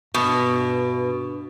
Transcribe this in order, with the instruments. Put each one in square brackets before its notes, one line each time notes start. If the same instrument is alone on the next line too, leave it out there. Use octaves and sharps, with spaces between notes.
[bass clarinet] G2 [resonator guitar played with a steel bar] B2